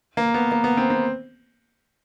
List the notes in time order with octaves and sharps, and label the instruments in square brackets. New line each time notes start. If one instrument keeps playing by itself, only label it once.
[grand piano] A#3
B3
A#3
B3
C4
C4